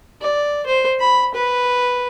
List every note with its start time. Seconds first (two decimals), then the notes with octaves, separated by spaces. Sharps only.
0.22 D5
0.66 C5
1.00 B5
1.34 B4